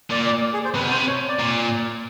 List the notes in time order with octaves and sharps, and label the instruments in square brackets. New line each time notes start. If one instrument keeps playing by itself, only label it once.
[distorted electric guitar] A#2 [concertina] D5
[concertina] D5
G#4
C5
[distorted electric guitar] C3 [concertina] B4
[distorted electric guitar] B2
[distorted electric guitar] C3 [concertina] C5
[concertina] C#5
D5
[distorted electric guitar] A#2